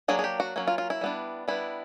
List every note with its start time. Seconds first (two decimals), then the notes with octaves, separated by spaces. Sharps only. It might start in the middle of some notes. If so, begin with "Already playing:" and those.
0.08 F#3 A#3 D4 G#4
0.19 G#4
0.24 G4
0.40 F#4
0.56 F#3 A#3 C#4
0.67 F4
0.78 F4
0.90 E4
1.01 G3 B3 D4
1.48 G3 B3 D4 E4